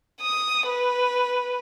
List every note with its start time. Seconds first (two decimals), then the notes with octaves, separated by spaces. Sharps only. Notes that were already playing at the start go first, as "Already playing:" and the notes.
0.21 D#6
0.67 B4